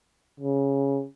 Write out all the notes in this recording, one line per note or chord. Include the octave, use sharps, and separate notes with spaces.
C#3